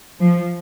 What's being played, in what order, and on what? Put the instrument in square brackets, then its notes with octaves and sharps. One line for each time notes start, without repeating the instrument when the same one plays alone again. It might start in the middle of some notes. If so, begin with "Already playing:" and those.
[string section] F3